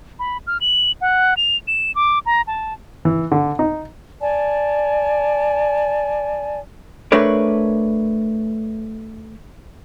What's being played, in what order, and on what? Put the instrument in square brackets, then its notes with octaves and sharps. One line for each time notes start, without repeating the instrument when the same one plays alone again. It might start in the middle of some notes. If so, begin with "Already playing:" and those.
[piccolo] B5
F6
F#7
F#5
F7
E7
D6
A#5
A5
[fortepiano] E3
D3
D#4
[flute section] D5 G#5 A5
[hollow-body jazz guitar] A3 D4 A#4 B4 C#5 D5